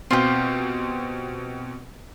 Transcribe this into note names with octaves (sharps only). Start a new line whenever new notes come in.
B2 C4 F4 G4